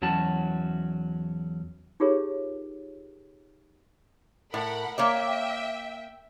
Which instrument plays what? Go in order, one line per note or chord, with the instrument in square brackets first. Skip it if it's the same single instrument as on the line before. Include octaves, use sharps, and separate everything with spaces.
[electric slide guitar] E2 F#3 C#4 F#4 A5
[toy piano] D#4 F4 G4 G#4 A#4 C#5
[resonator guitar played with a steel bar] A2 [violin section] A#4 F#5 B5
[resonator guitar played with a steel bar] A#3 C#5 D5 [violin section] E5 G5